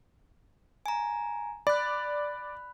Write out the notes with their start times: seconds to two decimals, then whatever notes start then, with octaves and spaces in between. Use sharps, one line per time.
0.86 G#5 A#5
1.67 D5 B5 F#6